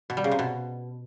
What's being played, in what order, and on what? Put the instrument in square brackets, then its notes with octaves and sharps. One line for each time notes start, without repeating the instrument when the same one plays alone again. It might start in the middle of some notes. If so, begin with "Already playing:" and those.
[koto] B2
G3
C#3
C3
B2